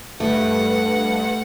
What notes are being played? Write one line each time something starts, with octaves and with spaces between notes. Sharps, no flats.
G2 A3 B4 F#5